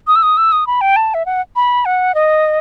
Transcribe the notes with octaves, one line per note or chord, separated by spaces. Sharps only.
D#6
E6
D#6
E6
D#6
B5
G5
A5
E5
F#5
B5
F#5
D#5